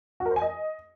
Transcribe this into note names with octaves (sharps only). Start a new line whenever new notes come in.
F#4
A#4
C5
G#5
D#5